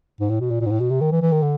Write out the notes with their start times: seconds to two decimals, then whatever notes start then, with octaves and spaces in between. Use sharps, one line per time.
0.20 G#2
0.29 A2
0.40 B2
0.50 A#2
0.61 A#2
0.66 G#2
0.70 A2
0.80 B2
0.90 C3
1.01 D#3
1.12 E3
1.22 E3
1.32 D#3
1.42 D3